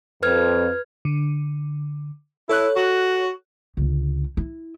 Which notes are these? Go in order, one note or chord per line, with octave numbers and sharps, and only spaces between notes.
F2 B4 F6 G#6
D3
E4 A4 C#5 F#6
F#4
C#2 D3
E4